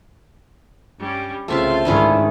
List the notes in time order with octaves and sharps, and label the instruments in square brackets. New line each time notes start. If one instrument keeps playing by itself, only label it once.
[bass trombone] G2 [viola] G3 C#4
[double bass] C2 C4 [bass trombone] C#3 [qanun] A3 E5 A5 [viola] F4 F5
[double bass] G#2 D#3 [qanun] C#4 E4 B4 [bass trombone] D4